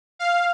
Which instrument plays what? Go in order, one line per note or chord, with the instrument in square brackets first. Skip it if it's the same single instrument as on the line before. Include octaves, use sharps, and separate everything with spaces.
[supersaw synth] F5